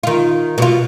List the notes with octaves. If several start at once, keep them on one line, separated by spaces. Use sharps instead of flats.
D#3 F4
B2 F4